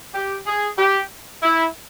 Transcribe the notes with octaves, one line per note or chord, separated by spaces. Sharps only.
G4
G#4
G4
E4